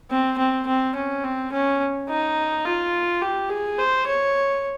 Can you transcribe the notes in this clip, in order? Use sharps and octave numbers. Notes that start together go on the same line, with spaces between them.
C4
C4
C4
C#4
C4
C#4
D#4
F4
G4
G#4
C5
C#5